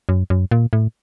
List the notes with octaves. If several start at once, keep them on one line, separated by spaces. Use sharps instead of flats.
F#2
F#2
A#2
A2